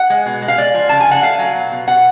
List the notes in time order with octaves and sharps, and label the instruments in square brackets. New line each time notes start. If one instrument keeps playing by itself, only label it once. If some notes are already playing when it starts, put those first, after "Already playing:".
Already playing: [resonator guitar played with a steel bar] F#5
G#3
B2
G#3
F5
G#3 D5
F3
C#3 A5
G#5
C#3 F#5
A3 F5
F#3
B2
B2
B2 F#5